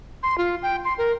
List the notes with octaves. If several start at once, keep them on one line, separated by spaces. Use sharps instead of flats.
C6
F4
G5
C6
A#4